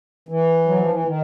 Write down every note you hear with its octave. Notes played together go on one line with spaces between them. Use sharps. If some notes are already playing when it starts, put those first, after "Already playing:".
E3
F#3
F3
E3
D#3